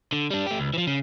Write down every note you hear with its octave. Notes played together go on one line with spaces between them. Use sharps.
D3
G3 D4
A3 G4
C#2
E3 F3
C#3